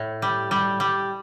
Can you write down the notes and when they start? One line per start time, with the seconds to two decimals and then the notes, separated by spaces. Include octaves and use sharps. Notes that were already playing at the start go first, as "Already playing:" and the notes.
Already playing: A2
0.22 G3
0.51 G3
0.80 G3